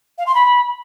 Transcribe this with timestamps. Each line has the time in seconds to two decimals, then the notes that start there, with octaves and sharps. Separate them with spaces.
0.18 F5
0.26 C6
0.34 B5